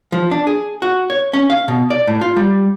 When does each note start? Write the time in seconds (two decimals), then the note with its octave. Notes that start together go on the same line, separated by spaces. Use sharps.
0.12 F3
0.31 D4
0.47 G#4
0.82 F#4
1.10 C#5
1.33 C#4
1.50 F5
1.68 B2
1.90 D5
2.07 A2
2.21 F4
2.36 G3